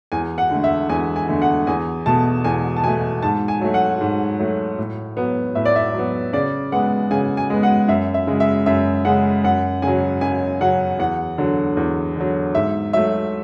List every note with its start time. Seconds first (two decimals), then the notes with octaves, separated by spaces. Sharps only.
0.12 E2 G#5
0.38 F#5
0.51 D3 A3
0.64 E5
0.89 E2 G#5
1.16 G#5
1.29 D3 A3
1.42 F#5
1.67 E2 G#5
2.06 B2 A3 A5
2.44 E2 G#5
2.77 A5
2.84 B2 A3 G#5
3.23 G#2 A5
3.48 G#5
3.61 F#3 A3
3.74 F#5
4.01 G#2
4.39 F#3 A3
4.78 A2
5.17 F#3 B3
5.55 A2 E5
5.65 D5
5.76 E5
5.94 F#3 B3
6.33 C#3 D5
6.72 G#3 B3 F#5
7.11 C#3 G#5
7.37 G#5
7.50 G#3 B3
7.63 F#5
7.88 F#2 E5
8.14 E5
8.27 C#3 G#3
8.40 E5
8.66 F#2 E5
9.05 C#3 G#3 F#5
9.44 F#2 F#5
9.82 C#3 F#3 G#5
10.21 F#2 G#5
10.61 C#3 F#3 F#5
10.99 E2 F#5
11.38 D3 F#3
11.77 E2
12.16 D3 F#3
12.54 G#2 E5
12.93 F#3 A3 E5